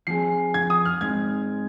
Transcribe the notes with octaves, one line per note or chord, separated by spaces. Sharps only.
F3 C4 G#4 C7
G#6
D#6
F6
G#2 G#3 C4 D#4 G#6